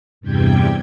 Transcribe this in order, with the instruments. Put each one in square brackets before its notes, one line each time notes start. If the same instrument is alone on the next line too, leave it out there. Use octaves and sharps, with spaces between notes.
[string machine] E2 G2 C3 G3 G5 G#6